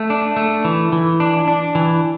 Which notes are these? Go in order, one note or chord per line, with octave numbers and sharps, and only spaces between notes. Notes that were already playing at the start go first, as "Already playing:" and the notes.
Already playing: A3
D4
A3
E3
E3
D4
D4
E3